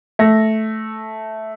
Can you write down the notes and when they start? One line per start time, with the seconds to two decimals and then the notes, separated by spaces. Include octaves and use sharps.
0.19 A3 A#6